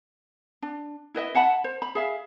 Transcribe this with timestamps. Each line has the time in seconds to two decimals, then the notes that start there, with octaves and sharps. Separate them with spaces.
0.62 D4
1.15 E4 B4 D#5 E5
1.35 E5 F#5 A5 B5
1.64 C5
1.82 B5
1.95 G#4 E5 F5